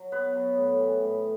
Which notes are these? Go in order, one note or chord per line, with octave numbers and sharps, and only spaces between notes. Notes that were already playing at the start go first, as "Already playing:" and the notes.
Already playing: F#3
B2 B3 B4
F#3
A2
E3
A2